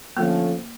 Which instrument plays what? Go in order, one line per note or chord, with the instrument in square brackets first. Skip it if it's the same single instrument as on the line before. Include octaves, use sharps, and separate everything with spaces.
[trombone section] D3 F3 A3 C#4 [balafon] A#3